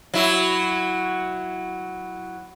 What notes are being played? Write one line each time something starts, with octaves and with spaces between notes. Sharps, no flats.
F#3 E4